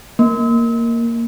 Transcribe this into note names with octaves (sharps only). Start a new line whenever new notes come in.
A#3